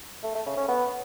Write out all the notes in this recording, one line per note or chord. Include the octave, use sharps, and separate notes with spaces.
A3
A3
C#3
C#4
B3